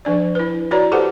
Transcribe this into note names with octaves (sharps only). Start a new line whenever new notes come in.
F3 D4 D5
E4 B4
E4 F#4 B4 C#5 D5 A#5
G4 A4 B4 C5 F#5 A5